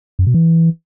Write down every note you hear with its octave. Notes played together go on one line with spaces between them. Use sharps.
F#2
B2
E3